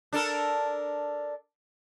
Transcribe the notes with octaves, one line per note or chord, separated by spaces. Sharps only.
D4 A4 A#4